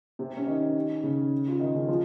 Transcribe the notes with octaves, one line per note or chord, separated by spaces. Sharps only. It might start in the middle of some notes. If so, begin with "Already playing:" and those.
C3 C4
C#4
D#3 D#4
C#3 C#4
F4
D#3 D#4
C#3 C#4
F3 F4